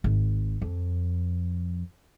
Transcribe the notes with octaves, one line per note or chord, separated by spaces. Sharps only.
G#1
F2